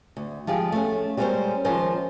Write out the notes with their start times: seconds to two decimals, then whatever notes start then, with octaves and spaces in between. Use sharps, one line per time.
0.17 D2
0.47 F3 G#3 G4 G#4
0.72 A3 C#4
1.17 G3 G#3 B3 C#4 A#4 C5
1.65 D#3 F3 G#3 C#4 A#4 C5